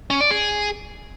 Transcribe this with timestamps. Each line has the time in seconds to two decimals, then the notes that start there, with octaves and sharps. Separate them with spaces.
0.10 C#4
0.21 D5
0.31 G#4